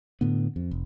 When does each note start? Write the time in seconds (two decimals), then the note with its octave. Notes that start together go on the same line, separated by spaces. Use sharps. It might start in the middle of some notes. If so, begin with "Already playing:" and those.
0.21 A2 D3 B3
0.56 F2
0.71 F1